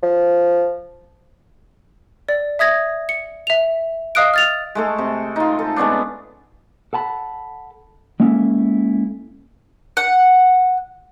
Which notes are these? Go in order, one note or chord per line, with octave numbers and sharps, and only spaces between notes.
F3
D5
E5 D#6 G#6 A#6
C#7
E5 F7
D#5 F5 D#6 F#6 D7
F6 A6 F7
G#3 A3 A4
C3
D#4 F4
A4
G#3 B3 C#4 D4
A4 F#5 A5 B5
G#3 A#3 C#4 E4 A4
F#5